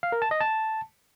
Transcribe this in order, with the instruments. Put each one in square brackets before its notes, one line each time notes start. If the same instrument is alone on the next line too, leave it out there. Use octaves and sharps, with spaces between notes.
[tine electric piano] F5
A#4
A5
D#5
A5